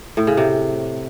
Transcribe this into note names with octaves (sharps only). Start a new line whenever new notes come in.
A2
C#3
C3